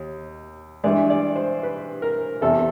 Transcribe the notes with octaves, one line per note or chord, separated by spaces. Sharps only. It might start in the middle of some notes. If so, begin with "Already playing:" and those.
Already playing: D#2
G2 E3 G#3 D5
D5
C5
B4
A#4
E2 C3 E3 A4